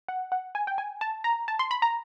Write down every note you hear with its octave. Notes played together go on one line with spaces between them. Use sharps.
F#5
F#5
G#5
G5
G#5
A5
A#5
A5
C6
B5
A#5